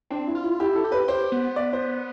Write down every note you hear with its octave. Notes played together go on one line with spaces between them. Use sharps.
C4 D4
E4
F4
E4
E4 G4
A4
G4
B4
G4 C5
B3
D5
C5